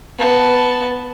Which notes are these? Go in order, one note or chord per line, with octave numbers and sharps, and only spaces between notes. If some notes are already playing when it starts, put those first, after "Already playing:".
B3 A5